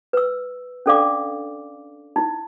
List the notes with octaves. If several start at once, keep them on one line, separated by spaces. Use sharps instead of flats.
B4 E6
C#4 D4 A4 D5 F5 D6
D#4 E4